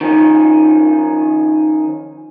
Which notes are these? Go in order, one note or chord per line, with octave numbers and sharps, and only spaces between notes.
D#3 F3 C#4 D#4